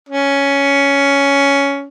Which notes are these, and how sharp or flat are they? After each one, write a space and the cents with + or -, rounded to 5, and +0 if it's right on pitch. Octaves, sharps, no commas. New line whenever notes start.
C#4 +10